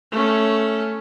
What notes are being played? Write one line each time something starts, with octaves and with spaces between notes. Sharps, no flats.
A3 C#4